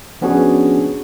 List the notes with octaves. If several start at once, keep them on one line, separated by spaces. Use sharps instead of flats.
F3 B3 C#4 D4 F#4 G#4